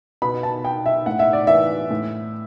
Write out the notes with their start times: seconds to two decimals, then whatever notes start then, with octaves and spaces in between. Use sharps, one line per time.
0.22 B2 B5
0.43 A5
0.65 G5
0.86 E5
1.06 A2 F#5
1.19 E5
1.33 D5
1.47 E3 E5
1.91 A2